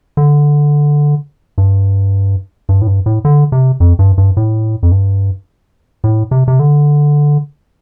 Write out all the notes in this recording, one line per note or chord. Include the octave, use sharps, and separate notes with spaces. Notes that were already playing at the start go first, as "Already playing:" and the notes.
D3
G2
G2
A2
G2
A2
D3
C3
F2
G2
G2
A2
F2
G2
A2
C3
C3
D3